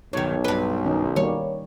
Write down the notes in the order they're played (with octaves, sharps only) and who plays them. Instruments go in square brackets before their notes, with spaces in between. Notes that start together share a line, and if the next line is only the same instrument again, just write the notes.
[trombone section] B1 [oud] G2 D#3 [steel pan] C#5
[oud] G2 B4
[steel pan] D#3 C#4 D#4
[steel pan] D#3 G3 A#3 [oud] C#5